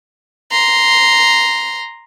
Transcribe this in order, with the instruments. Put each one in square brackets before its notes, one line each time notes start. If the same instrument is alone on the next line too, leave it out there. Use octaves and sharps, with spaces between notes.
[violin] A#5 C6